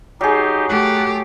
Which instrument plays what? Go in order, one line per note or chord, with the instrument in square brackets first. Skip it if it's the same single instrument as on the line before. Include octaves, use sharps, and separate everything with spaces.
[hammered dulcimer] F#3 G#4 [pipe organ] D#4 G4
[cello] A3 G4 [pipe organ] F#5